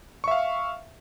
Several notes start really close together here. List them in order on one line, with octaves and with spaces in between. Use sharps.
C#6 E5 F5